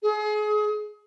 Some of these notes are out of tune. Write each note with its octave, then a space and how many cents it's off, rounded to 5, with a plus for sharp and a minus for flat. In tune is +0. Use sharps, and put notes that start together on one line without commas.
G#4 +30